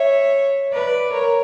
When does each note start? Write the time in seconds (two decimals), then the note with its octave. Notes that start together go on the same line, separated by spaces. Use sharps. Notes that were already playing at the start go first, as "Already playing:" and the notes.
Already playing: C#5 E5
0.72 B4 D5
1.12 A#4 C#5